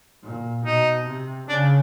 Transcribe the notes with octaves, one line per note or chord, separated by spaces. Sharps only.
A#2
B2 D#4
C3
C#3 D4